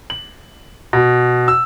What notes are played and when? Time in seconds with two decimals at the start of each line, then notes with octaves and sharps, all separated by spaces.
0.10 F#7
0.93 B2
1.48 E6